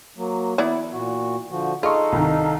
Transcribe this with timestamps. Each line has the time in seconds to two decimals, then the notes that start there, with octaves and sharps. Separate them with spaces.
0.17 F#3 A#3
0.58 E3 B3 E4 D5
0.93 A#2 F#4
1.50 D3 F3 F#4
1.83 D#4 F4 G#4 A4 D#5 F5 C#6
2.12 C2 D#3